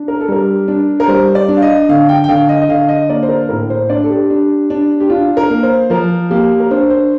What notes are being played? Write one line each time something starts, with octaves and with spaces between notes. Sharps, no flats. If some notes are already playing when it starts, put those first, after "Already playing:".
Already playing: D4
A#4
A4
G3 A#4
D4
A#4
G3 C5
D5
D4
F5
D#5
D3 F5
G5
G5
D3 F5
D#5
D#5
D3 F5
D#5
A#3 D5
C5
A#4
A2 A#4
C5
D4 D5
A4
G4
D4
D4
G4
D4 F4
A#4
A#3
C5
F3 A#4
A#3 G4
A#4
D4 C5
C5